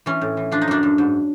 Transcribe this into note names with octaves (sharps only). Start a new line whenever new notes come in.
E3 C#4
A2
E3
F3 D4
D#4
F#2 D4
F#2
G#2